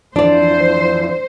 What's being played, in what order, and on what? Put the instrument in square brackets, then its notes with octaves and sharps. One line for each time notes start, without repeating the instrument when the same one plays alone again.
[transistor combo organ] F2 E3 [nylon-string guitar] D4 D5 [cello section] C5